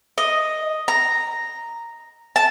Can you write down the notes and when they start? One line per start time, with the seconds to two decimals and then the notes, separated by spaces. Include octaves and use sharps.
0.18 D#5
0.88 A#5
2.36 A5